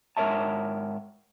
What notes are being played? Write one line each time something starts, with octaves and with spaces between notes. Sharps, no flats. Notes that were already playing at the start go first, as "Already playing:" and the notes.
G#2 A#4 C#5 E5 A5